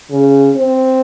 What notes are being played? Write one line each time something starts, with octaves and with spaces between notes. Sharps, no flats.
C#3
C4